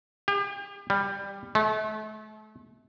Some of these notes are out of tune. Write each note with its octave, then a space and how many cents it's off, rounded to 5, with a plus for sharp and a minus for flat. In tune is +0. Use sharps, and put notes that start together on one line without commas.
G4 +40
G3 +15
A3 -35